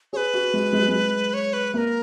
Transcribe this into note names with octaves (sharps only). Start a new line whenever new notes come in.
G#4 B4 C#5
F#4
G#3
G#3
F#3
G#3
C#5
B4
A#3 A#4 B4